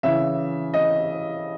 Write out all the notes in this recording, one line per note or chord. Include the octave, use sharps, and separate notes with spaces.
C#3 E3 E5
D#5